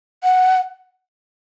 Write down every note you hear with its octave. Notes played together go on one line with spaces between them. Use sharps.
F#5